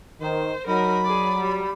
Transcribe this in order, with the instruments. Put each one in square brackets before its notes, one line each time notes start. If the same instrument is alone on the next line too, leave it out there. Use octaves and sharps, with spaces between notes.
[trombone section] D#3 [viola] C5
[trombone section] F#3 [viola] D#4 A#4 [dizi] B5
[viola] G#4 D5
G3